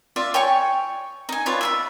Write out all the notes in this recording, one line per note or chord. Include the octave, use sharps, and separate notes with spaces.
F4 D5 E5
C#5 G5 G#5 C#6
D#4 G#5
F4 B4 C#5 D5
E5 F5 B5